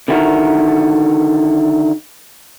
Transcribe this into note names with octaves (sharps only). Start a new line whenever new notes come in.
D3 D#3 E4 F#4 A#4